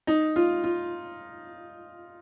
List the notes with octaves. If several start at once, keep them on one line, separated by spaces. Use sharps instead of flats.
D#4
F4
F4